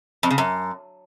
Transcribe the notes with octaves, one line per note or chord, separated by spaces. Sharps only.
F2
C#3
F#2